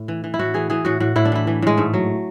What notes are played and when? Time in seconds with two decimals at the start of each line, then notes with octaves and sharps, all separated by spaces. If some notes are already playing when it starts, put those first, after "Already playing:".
Already playing: A2
0.08 E3
0.24 E3
0.34 E4
0.39 A2 F#4
0.54 E3 G#4
0.70 E3 G#4
0.85 A2 F#4
1.00 A2 F#4
1.16 A2 E4
1.25 D4
1.32 E3 E4
1.47 E3
1.62 A2 G#3
1.77 G#2 A3
1.94 F#3